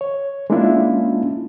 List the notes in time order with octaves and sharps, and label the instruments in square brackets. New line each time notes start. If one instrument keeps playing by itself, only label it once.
[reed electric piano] C#5
G#3 A#3 C#4 D4 E4 F4